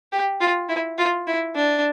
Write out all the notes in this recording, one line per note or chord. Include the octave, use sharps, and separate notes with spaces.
G4
F4
E4
F4
E4
D4